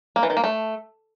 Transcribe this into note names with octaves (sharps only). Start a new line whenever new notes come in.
A#3
E3
D#3
A#3
A3